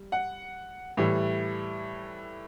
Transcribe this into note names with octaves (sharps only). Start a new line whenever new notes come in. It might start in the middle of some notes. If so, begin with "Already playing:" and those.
Already playing: G3
F#5
A2 E3 G3